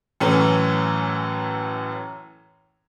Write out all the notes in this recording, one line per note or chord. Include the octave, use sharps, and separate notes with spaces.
F#2 A2 E3 C#4